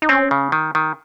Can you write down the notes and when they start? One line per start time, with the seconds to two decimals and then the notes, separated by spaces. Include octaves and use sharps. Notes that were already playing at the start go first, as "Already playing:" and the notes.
0.02 D#4
0.09 C4 C#4
0.31 C#3
0.52 D#3
0.75 D#3